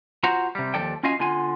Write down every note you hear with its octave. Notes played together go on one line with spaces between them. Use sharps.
F4 F#4 C5 F#5 A#5
C3 G3
D#2 A#2 F3 A4 D5 G5
C#4 F4 F#4 D#5 F5 G#5
D3 B3 F4 G#5